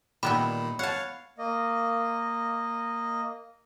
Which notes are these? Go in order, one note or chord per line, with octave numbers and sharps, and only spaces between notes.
A#2 D#3 G3 B3 E4 B5
C#5 F5 F#5 A5
A#3 D#5